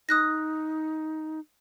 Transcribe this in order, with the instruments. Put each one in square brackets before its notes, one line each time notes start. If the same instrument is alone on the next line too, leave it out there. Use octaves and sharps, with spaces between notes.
[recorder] D#4 [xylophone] D#6 F#6 A#6